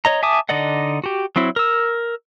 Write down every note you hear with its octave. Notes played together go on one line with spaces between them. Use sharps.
C#5 D#5 A#5
E5 G#5 A5 D6 D#6
D3 D#4 D5 D#5 F#5
F#4 G4
F#3 C4 E4
A#4 E6